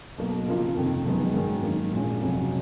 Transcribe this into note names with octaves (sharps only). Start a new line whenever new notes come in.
B1 B2 A#3
C#3 F3 A#3 F4
F1 F2 D#3
F#1 F#2 D#3 G#3 B3
G#2 D#3 F#3 C#4
F#2 D#3 A#3
A#1 A#2 G#3 C#4
F1 F2 C#3 F#3 C#4